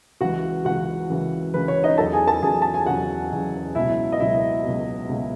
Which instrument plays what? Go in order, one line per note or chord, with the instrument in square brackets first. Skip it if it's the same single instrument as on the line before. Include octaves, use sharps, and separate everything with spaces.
[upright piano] C#2 C#3 E3 F#4 F#5
C#2 C#3 E3 F#4 F#5
C#2 C#3 E3
C#2 C#3 E3 B4
C#5
D#4 D#5
E2 C#3 F#3 A4 A5
G#4 G#5
A4 A5
E2 C#3 F#3 G#4 G#5
A5
G#5
E2 C#3 F#3 F#4 F#5
E2 C#3 F#3
C#2 B2 F#3 E4 E5
D#5
C#2 B2 F#3 E4 E5
C#2 B2 F#3
C#2 B2 F#3